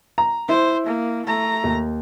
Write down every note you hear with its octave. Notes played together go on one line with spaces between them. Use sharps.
A#5
E4 C5
A#3
A3 A#5
D#2